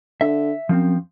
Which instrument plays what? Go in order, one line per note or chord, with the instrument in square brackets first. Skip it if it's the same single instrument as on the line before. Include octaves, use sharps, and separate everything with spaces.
[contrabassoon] D3 [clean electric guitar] E5
[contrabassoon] F#2 [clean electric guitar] F3 C4